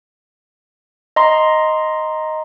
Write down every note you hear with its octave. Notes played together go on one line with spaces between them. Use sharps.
D#5 A#5 C6